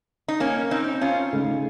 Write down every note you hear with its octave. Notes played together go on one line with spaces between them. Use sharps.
D#4
A#3 C#4
C4 D#4
C#4 F4
C#3 A3 D#4